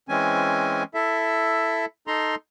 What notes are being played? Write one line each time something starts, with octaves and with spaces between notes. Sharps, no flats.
E3 G#3 C4 C#4 G#5
E4 A4 E5
D#4 A4 A#5 C6